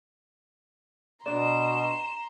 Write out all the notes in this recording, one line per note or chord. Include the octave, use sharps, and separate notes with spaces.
B2 D4 D5 A#5 C6 E7